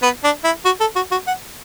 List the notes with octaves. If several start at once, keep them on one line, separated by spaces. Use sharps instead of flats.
B3
D4
E4
F#4
A4
F#4
F#4
F#5